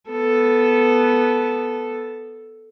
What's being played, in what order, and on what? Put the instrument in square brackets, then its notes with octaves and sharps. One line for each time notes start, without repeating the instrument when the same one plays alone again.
[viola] B3 A4